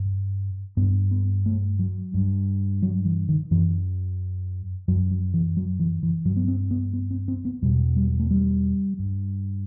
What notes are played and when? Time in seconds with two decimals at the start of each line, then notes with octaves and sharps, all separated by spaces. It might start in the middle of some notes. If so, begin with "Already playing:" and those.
Already playing: G2
0.77 G2 B3
1.11 B3
1.46 A3
1.79 F#3
2.14 G2
2.82 F#3
3.05 E3
3.29 D#3
3.51 F#2 E3
4.88 F#2 F#3
5.11 F#3
5.34 E3
5.57 F#3
5.79 E3
6.03 E3
6.25 G2 F#3
6.36 B3
6.48 C4
6.71 B3
6.93 B3
7.11 C4
7.28 C4
7.45 B3
7.62 E2 B2 G3
7.96 G3
8.20 A3
8.31 G3
8.99 G2